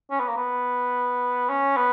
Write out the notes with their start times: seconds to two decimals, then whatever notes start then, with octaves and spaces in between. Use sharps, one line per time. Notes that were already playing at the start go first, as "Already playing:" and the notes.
0.11 C#4
0.20 B3
0.28 A#3
0.37 B3
1.49 C#4
1.77 B3